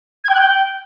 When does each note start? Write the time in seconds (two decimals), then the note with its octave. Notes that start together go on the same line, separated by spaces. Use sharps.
0.24 G#6
0.29 G5
0.34 F#6
0.39 G5